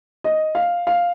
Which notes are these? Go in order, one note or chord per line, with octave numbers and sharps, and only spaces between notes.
D#5
F5
F5